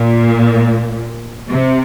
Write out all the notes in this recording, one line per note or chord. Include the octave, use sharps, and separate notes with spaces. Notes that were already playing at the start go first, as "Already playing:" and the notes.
Already playing: A#2
C3